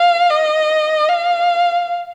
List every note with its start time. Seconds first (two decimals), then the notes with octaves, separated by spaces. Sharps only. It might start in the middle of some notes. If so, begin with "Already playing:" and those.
Already playing: F5
0.31 D#5
1.08 F5